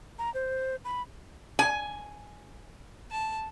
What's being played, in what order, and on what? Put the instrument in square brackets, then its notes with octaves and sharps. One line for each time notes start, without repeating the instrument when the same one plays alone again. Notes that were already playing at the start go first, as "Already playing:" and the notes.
[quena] A#5
C5
B5
[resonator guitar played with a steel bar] G#5
[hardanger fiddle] A5